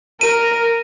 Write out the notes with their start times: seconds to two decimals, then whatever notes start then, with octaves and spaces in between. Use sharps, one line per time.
0.21 A#4 D#7